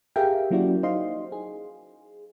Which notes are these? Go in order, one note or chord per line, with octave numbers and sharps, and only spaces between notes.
G4 G#4 A#4 E5 F5 G5
F#3 A#3 C#4 E4 F#4 D5
D#4 C5 D#5 F5 C6
G#4